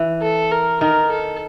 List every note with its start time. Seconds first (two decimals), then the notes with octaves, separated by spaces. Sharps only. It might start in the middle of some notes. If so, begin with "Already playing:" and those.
Already playing: E3
0.22 A4
0.51 A#4
0.81 D#3 A#4
1.11 A4